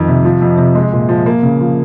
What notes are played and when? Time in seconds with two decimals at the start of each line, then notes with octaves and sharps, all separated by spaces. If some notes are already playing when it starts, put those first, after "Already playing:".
Already playing: F2 D#3
0.08 C3
0.25 F3
0.42 F2
0.58 C3
0.75 G#3
0.93 A#2
1.09 F3
1.26 A#3
1.43 C#3
1.60 F3